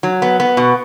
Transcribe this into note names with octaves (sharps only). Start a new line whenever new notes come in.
F#3
B3
B3
B2